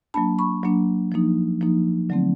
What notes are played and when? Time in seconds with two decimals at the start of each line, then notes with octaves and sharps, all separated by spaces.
0.14 F#3 A#3 D4 A5 B5
0.39 B5 C#6
0.63 F#3 A#3 D4
1.12 F3 A#3 D#4
1.61 F3 A#3 D#4
2.09 D3 F#3 A3 C4